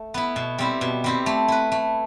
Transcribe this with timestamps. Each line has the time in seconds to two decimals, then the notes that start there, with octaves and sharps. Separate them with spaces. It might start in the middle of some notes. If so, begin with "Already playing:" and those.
Already playing: A3
0.14 B3 E4
0.36 B2
0.59 G3 C4 E4
0.81 B2
1.04 G3 C4 E4
1.26 A3
1.48 E4 B4
1.72 A3